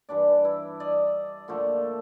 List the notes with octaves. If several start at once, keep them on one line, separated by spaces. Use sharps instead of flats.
G2 E3 D4 D5
E4
D5 D#5
A#2 D3 F3 A3